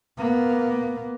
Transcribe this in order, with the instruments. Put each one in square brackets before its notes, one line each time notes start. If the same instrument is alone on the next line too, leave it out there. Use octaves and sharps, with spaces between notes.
[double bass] A#3 B3